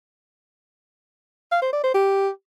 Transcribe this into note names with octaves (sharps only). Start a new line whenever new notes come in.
F5
C5
D5
C5
G4